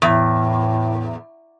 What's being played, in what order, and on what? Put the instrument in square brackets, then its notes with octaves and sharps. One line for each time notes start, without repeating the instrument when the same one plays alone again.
[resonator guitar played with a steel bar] E2 [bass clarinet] A2